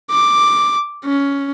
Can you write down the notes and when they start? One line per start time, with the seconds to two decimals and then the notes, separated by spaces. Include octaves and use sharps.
0.10 D6
1.05 C#4